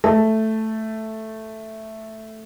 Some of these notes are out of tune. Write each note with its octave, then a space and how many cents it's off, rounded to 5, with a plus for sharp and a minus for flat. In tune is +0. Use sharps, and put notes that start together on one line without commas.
A3 +0 A5 +0